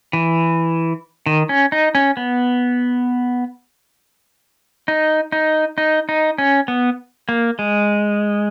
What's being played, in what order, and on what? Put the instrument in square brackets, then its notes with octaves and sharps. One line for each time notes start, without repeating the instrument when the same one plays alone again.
[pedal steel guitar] E3
D#3
C#4
D#4
C#4
B3
D#4
D#4
D#4
D#4
C#4
B3
A#3
G#3